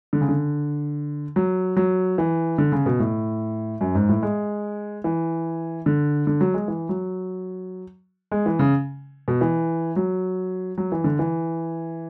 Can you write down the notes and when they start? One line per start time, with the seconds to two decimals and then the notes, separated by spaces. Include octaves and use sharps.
0.13 D3
0.21 C#3
0.29 D3
1.36 F#3
1.77 F#3
2.18 E3
2.58 D3
2.72 C#3
2.86 B2
2.99 A2
3.81 F#2
3.95 G#2
4.09 A2
4.22 G#3
5.04 E3
5.86 D3
6.27 D3
6.41 F#3
6.54 G#3
6.68 E3
6.89 F#3
8.32 G#3
8.46 E3
8.59 C#3
9.28 B2
9.41 E3
9.96 F#3
10.78 F#3
10.92 E3
11.04 D3
11.19 E3